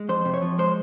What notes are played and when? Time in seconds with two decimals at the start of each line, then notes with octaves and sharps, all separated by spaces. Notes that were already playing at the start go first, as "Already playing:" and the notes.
Already playing: G#3
0.09 F2 C5
0.25 C3
0.34 C#5
0.42 F3
0.58 G#3 C5